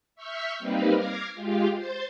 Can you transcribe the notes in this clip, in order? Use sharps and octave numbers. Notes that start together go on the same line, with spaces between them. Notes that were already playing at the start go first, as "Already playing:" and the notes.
E5 C#6 E6 F6 G6 B6
G3 A#3 C4 D#4 B4 F5
D6 F6 G#6 A#6 C7
G#3 F4 G4 F5
C5 G6 A6